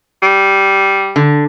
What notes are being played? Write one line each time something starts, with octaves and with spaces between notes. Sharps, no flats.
G3
D3